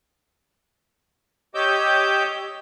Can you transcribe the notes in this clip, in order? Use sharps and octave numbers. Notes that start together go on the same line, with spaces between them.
G4 C#5 D#5 D6 E6 G6